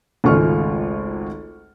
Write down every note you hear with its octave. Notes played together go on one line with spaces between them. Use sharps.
G#1 C#2 A3 F4 C#6 F6